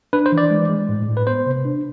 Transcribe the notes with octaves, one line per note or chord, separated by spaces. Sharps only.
D4 B4
C5
E3
D5
G#3
G#3
A2
A2
B4
B3 C5
C3
D4